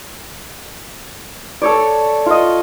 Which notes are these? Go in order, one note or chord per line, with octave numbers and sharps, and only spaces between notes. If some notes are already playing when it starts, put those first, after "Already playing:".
A4 C#5 D5
F4 D#5